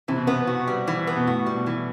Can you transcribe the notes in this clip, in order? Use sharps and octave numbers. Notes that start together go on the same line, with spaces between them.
C3 E3
B2
C3 B3
F#4
G3
E3
B3
B2
A2 F#4
G3
B2
E3